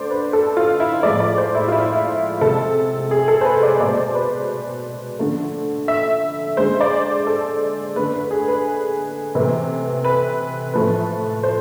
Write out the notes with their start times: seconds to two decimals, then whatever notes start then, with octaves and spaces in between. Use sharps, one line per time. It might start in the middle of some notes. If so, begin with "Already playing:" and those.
Already playing: D3 A3 C5 D5
0.11 B4
0.33 A4
0.57 F4
0.80 E4
1.03 A2 F3 G#3 D5
1.20 D5
1.38 C5
1.55 E4
1.68 F4
1.72 E4
1.96 E4
2.41 C3 G#3 A4
3.11 G#4
3.28 A4
3.41 C5
3.45 B4
3.63 D5
3.80 B2 G#3 D5
3.97 C5
4.15 B4
5.19 D3 F3 A3
5.88 E5
6.57 D3 G#3 C5
6.81 D5
7.27 A4
7.96 D3 A3 B4
8.14 B4
8.31 G#4
8.48 B4
9.35 C3 E3 A3
10.04 B4
10.74 A2 F3 A3 B4
11.43 C5